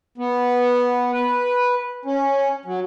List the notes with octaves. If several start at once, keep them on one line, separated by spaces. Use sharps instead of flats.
B3
B4
C#4
F#3